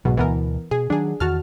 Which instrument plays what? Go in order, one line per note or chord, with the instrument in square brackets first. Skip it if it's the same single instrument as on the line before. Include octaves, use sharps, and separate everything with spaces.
[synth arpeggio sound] B1 G#2 B2 [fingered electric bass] F#3
[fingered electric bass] D2 B2 [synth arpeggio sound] E3 B3 A#4
[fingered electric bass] B2 [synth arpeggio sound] G#4
[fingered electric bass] D#3 F#3 [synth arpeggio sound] D4 G#4
[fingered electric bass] E2 D#3 [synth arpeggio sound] F#4 A5 F6